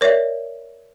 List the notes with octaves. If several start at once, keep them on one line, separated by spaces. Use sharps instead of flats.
A#4 C#5 D5 E5